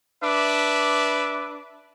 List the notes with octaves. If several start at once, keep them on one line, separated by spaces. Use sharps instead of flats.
D4 B4 E5 D6